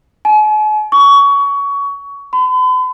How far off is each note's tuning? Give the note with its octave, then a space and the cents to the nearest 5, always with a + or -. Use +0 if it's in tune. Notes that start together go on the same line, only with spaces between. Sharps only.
G#5 +45
C#6 +25
B5 +45